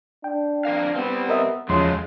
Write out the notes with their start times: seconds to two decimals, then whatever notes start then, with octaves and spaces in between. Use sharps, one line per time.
0.24 D4 G5
0.65 F2 A#4 F5
0.95 G3 B3 C4
1.29 A#4 D#5 E5
1.69 E2 C#3 F3 F#3 G#3 A3 C6